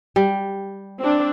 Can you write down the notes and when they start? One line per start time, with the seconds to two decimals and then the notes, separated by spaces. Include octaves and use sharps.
0.16 G3
1.02 C4 D4